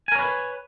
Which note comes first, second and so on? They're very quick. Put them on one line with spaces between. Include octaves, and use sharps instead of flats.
G#5 A#4 C#5 B4